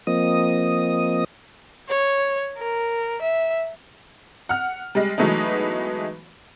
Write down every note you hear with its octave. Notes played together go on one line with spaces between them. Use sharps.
F3 A#3 C4 D#5 D#6
C#5
A#4
E5
F#5 F6
G3 G#3
E3 F#3 G#3 A3 B3 D#4